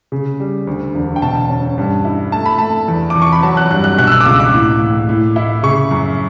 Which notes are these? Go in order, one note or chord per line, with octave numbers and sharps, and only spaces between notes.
C#3
G3
D2
E1
G5
B2 A5
C#4
G2
E4
A3 A5
B5
A3 A5
E2
D6
E2
C#6
B5
F#3 A5
F#6
G2 F#6
F#6
B2 F#6
E6
F#6
D6
C#2 E6
D6
A2
A2
A2
E4
C#3 C#6
F#2